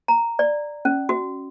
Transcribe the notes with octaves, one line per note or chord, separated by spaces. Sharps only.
A#5
D5
C#4
F#4